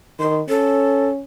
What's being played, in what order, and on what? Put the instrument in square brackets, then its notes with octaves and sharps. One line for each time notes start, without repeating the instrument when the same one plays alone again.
[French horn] D#3 [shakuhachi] C6
[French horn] C#4 [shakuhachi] A4